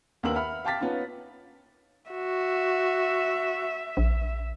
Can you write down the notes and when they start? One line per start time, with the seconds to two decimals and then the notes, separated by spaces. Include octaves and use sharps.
0.23 D#2 B3 D4 A#4 E6 F#7
0.35 E5 F#5 B5 F6
0.65 F5 G5 A5 D6 A6 B6
0.81 B3 C#4 D#4 F4
2.11 F#4 E5
3.97 A#1